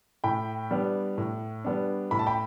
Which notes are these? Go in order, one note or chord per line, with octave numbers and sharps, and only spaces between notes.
A2 G5 B5
G3 B3 D4
A2
G3 B3 D4
A2 B5
A5
G5 B5